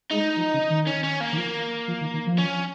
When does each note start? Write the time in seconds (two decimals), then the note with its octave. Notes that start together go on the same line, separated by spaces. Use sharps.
0.11 G#3 D#4
0.37 F3
0.54 C#3
0.70 D#3
0.87 C#4
1.04 C#4
1.21 A#3
1.33 D#3
1.37 F3
1.88 F3
2.01 D#3
2.14 D#3
2.26 F3
2.39 C#4